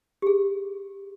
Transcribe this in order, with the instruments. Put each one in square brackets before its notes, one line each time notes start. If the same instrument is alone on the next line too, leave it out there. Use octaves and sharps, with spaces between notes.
[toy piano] G4 G#4